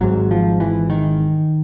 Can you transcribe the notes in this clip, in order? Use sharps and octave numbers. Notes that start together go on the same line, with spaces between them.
G#1 G#2 F#3
F3
E3
D#3